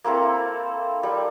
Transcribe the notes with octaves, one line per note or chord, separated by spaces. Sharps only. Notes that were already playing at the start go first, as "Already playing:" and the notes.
A#3 C4 E4 A4
G3